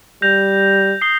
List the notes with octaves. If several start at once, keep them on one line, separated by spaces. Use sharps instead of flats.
G3 G6 A#6 F7
D#6 C7 G7